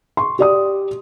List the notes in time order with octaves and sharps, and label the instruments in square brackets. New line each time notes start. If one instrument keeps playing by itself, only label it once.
[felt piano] C6 C#6
G4 D5 D#6